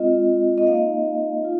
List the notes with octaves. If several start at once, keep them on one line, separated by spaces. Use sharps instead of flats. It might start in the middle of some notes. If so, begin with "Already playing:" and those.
Already playing: G#3 C4 F4 D#5
D#5
A#3 D#4 F5
F4